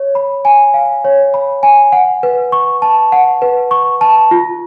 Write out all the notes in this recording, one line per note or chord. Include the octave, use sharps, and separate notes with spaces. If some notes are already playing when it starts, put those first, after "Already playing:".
Already playing: C#5
B5
G#5
F5
C#5
B5
G#5
F#5
B4
C#6
A5
F#5
B4
C#6
A5
F4